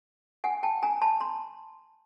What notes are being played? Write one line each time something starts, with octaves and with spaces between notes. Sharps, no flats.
F#5 G#5
G5 A5
G#5 A#5
A5 B5
A#5 C6